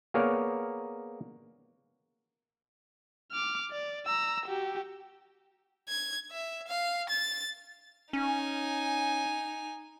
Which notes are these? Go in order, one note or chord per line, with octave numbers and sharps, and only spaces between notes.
A#3 B3 G#4 A#4 C#5 D5
D6 F6
D5
A#5 E6
F#4 G4
G#6
E5
F5
A6
C#4 D#4 G#5